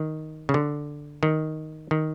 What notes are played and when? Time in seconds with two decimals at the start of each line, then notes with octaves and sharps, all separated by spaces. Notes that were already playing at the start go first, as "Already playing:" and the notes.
Already playing: D#3
0.49 C#3
0.54 D3
1.23 D#3
1.91 D#3